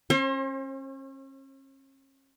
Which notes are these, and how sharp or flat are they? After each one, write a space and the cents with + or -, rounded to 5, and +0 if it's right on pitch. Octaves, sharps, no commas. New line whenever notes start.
C#4 -40 C5 +40